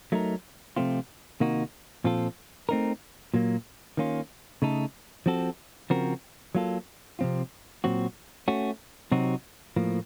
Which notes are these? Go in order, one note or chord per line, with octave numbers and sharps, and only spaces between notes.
F#3 A3 D#4 A#4
C3 F3 A3 C4 F4
C3 D#3 A#3 D#4 F#4
A#2 F3 C4 F4 A4
A3 C4 D#4 A#4
A#2 F#3 A#3
D#3 A#3 C#4 F4
C#3 A3 D#4 A4
F3 C4 F#4 A4
C#3 F3 C4 F#4 A#4
F#3 A#3 F4 A4
C3 F3 C4 F4
A#2 F#3 C4 F#4
A3 C#4 F#4
C3 F#3 C4 D#4 F#4
A2 F3 A#3